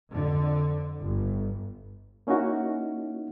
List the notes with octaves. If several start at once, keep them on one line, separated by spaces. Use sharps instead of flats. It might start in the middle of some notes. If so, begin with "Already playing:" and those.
F2 D3
G1
A#3 C#4 D#4 E4 F#4